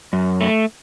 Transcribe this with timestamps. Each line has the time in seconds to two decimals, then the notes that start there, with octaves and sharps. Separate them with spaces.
0.13 F#2
0.41 A3